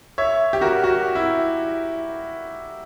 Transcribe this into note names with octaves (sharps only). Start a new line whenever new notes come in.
C#5 E5
G4
F#4 A#4
F#4
E4